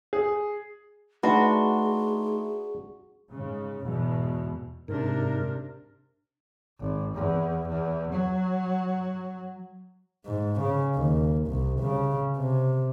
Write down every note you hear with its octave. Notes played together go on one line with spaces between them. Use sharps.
G#4
A3 D4 D#4 F#4 G#4 B4 C6
G#2 C#3
E2 G#2 B2
G#2 C3 D4 A#4
G#1
E2
E2
F#3
G#2
C#3
D#2
C2
C#3
C3